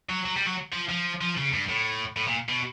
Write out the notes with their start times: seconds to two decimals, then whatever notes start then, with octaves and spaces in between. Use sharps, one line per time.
0.09 F#3
0.25 F#3
0.36 G3
0.46 F#3
0.73 F3
0.89 F3
1.21 F3
1.37 C#3
1.53 G2
1.69 A2
2.17 A2
2.27 A#2
2.49 B2